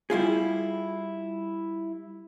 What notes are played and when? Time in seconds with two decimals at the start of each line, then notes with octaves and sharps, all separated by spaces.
0.10 G3 E4 F4 G#4